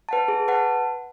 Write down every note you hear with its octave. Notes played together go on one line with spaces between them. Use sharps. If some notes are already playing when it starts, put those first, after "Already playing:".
B4 F#5 A5
G#4
B4 F#5 A5